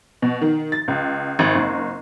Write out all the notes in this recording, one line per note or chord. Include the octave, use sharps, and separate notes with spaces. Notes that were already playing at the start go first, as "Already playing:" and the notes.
B2
D#3
A6
C#2
G#1
F#1